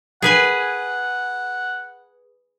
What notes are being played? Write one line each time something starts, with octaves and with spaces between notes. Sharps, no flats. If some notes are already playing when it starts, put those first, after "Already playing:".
G#4 B4 F#5 G#5